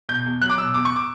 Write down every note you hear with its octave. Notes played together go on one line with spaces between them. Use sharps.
B2 G6
E2
F#3 F#6
D6
B2 E6
E2 D6
C#6
D6